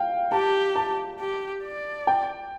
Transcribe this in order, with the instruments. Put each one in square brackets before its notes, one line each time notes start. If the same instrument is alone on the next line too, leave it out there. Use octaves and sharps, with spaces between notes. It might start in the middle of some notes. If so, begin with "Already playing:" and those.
Already playing: [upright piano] F5 G5
[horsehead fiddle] G4 [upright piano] A5
[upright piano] A5
[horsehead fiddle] G4
D5
[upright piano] G5